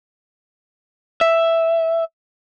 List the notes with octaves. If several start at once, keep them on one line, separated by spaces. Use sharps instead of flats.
E5